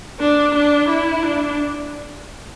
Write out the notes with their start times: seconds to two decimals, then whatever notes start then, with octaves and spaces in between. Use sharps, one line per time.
0.20 D4
0.54 D4
0.89 E4
1.23 D4